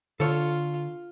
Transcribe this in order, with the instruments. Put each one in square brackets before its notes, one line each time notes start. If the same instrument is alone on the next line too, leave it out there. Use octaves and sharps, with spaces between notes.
[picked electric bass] D3 [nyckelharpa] F4 [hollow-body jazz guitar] A4 C#5